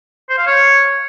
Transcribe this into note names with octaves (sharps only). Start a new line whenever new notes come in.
C5
F5
C#5